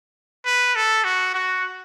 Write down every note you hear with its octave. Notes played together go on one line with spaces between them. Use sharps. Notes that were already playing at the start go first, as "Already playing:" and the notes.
B4
A4
F#4
F#4